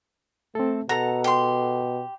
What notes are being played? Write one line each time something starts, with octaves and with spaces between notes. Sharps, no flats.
A3 C4 A4
B2 A4 F#5 A#5
G4 C6